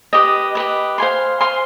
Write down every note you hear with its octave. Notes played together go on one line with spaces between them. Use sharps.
G4 B4 D#5
G4 B4 D#5
C5 F5 G#5 C6
C5 F5 G#5 C6